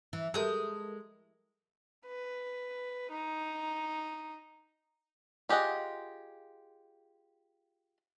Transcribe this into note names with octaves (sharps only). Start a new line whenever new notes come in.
E3
G#3 G4 A4 A#4 D#6 G6
B4
D#4
F4 G4 G#4 D#5 F#5